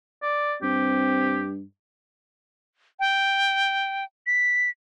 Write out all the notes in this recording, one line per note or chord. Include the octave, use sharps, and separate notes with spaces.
D5
G2 C4 G4
G5
B6